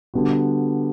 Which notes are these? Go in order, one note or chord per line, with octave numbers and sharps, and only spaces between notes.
D3 G3 B3 F#4